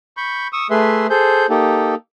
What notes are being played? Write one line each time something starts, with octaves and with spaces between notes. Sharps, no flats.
B5 C#6 G6
C#6 D#6 E6
A3 G#4 B4 E5 C6
G#4 A4 C5 G6
A#3 D#4 G4 A4